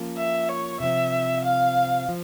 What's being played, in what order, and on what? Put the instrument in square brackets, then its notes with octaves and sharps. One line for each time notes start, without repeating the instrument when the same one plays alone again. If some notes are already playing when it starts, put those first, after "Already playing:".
Already playing: [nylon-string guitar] F3 A#3 C#4 F4
[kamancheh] E5
C#5
[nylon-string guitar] C3 F3 C4 [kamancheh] E5
[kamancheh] F5
[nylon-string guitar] F3